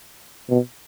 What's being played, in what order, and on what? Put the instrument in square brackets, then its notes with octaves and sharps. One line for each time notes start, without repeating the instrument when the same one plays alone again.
[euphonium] B2